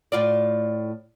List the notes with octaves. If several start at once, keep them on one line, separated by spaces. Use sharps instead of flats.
A2 F4 D5